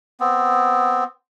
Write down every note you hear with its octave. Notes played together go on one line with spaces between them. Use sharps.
B3 C4